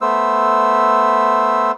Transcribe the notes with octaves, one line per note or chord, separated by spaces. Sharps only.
A3 B3 C5 E6